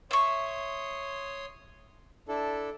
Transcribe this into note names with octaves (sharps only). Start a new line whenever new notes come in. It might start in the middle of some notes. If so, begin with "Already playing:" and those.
C#5 E5 C6 C#6 D#6
D4 E4 A4